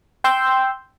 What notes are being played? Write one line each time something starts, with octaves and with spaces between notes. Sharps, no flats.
G5 C6 E6 G6